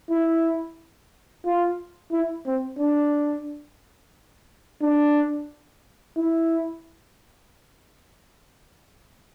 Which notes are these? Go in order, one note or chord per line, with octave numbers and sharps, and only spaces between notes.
E4
F4
E4
C4
D4
D4
E4